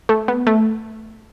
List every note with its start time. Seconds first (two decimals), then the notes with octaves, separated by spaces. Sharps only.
0.09 A3
0.28 B3
0.47 A3